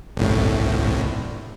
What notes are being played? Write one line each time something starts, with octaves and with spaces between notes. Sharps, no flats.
G1 C2 A2